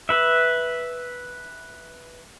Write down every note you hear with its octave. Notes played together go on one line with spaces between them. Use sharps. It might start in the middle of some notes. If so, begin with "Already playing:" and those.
B4 E5